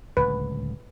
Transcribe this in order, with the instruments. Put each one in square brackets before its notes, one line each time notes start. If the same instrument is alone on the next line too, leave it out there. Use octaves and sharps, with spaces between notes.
[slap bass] D1 C#2 [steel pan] B4